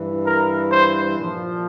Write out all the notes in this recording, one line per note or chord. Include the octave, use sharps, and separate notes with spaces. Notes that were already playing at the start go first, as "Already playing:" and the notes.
Already playing: G2 E3
A#4
C5
A#2 F3